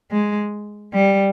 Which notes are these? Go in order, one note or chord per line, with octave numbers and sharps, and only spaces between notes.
G#3
G3